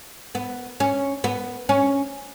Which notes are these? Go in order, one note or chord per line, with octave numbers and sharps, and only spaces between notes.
B3
C#4
B3
C#4